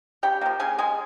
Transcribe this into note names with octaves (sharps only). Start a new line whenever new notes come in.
C#3 G4 G5
F3 A#3
C#3 G#4 G#5
G#3 G#4 G#5